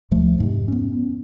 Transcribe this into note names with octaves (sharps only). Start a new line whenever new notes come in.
D2 B2 F3 A3
F2 G#2 C3
B3 C#4